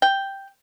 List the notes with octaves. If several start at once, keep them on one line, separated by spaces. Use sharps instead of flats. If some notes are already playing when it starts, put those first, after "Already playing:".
G5